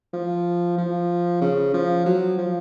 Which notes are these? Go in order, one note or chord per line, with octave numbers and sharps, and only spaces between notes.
F3
F3
C#3
F3
F#3
F3